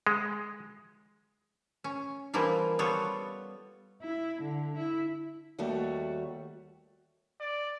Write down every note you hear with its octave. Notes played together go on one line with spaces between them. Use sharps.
G#3
C#4
E3 F3 G3 A#3 E4 F4
G3 B3 F4 A4 C#5
E4
D3
E4
D#2 G3 A3 F#4
D5